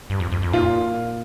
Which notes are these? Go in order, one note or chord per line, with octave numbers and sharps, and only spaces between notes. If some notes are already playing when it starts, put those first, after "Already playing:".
G2
F2
F2
F2
A#2 F4